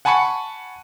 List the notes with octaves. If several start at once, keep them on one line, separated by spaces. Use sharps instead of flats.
F#5 G#5 A5 B5 C#6 C#7